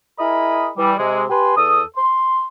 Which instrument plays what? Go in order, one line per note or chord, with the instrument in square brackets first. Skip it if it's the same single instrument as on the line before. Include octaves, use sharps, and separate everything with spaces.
[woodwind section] E4 G#4 A#4 D#5 B5
E3 G3
C3 G#3
G4 B4 G#5 C6
E2 A4 D#6
C6